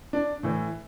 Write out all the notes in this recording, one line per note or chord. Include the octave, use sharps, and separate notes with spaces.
D4
A2 E3